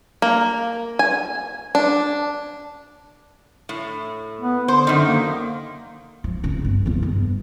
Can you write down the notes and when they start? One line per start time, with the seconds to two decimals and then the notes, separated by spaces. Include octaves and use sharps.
0.22 A#3
0.99 G#5
1.75 D4
3.69 A2
4.41 B3
4.68 D3 C5
4.87 F#2 D#3
5.06 A#3
6.24 F3
6.43 F2 C#3
6.65 G1
6.86 F2 A#3
7.02 G1